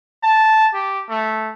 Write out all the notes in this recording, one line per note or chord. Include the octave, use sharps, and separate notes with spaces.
A5
G4
A3